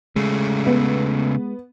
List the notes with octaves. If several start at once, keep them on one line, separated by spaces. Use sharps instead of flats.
C#3 G#3 A3
B3